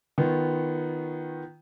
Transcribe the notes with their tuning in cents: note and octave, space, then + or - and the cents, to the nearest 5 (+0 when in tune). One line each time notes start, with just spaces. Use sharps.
D#3 +0 B3 +0 F4 -25